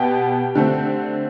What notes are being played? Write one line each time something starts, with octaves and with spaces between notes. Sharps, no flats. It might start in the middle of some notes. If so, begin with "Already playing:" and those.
Already playing: B2 B3 G4 G5
D3 A3 C4